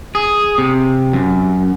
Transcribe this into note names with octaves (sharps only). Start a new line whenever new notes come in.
G#4
C3
F#2